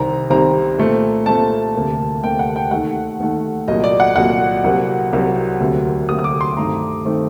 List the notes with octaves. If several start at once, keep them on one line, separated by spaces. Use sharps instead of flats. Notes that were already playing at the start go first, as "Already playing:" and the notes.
Already playing: C2 C3 D#3 G3 C4 A#5
C2 C3 D#3 G3 C4 A#5
A#2 A3 C4
A#2 A3 C4 A5
D2 C3 G3 A#3
D2 C3 G3 A#3 G5
F#5
G5
D#2 D#3 A3 F#5
D#2 D#3 A3
C2 A#2 F#3 D#5
D5
F#5
C2 A#2 F#3 F#5
C2 C3 F#3 A#3
C2 C3 F#3 A#3
D2 C3 F#3 A#3
D2 C3 F#3 A#3 D#6
D#6
D6
C6
G2 D#3 A3 C4 A#5
D#3 A3 C4